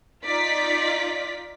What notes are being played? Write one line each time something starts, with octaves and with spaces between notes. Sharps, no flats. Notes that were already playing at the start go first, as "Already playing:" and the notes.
D#4 F4 D5 B6